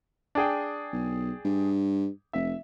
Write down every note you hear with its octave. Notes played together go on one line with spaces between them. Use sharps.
D4 G#4 G5
B1
G2
F1 E5